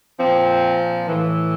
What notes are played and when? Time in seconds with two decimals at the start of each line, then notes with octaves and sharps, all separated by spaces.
0.18 A#2 F3 C4
1.07 A2 E3